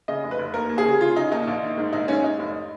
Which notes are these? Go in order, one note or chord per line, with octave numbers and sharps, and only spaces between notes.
C#3 D#5
F1
B4
F1
D#2 A#4
D#2
G#4
C#3
C#3 F4
C#3 D#4
D#2 D#4
A#1
D#3
G#2
A#1 D#4
G#2 C#4
G#2 D#4
F1